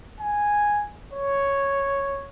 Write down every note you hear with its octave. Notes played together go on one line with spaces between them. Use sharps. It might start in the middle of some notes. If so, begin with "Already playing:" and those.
G#5
C#5